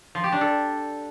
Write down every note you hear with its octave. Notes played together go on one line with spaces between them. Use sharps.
F3
G4
D4
A4